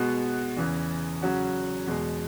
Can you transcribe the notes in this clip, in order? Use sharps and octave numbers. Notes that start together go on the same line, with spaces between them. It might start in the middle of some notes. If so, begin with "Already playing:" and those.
Already playing: B2 G#3 B3 F#4
E2 C#3 E3
C#3 F#3 C#4 F#4
E2 B2 G#3